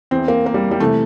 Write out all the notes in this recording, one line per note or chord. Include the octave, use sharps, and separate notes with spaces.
E2 E3 C4
A#3
A#3
G3
G3
C3 E3 A3